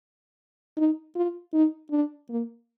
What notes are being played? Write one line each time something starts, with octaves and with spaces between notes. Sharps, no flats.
D#4
F4
D#4
D4
A#3